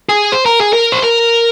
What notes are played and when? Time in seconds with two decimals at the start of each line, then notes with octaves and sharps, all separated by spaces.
0.09 G#4
0.32 C5
0.46 A#4
0.60 G#4
0.73 A#4
0.92 C5
1.02 A#4